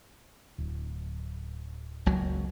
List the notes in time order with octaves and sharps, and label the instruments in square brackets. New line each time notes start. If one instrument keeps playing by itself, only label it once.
[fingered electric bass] D1
[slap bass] F#1 C#2 F#3